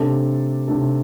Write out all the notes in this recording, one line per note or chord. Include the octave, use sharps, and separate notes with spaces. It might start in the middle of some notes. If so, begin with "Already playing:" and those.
Already playing: C3 A3 D4 A4
C3 A3 D4 A4